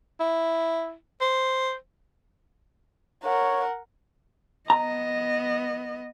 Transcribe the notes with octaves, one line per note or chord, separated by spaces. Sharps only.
E4
C5
A#4 C#5 F#5
B3 D#5 A#5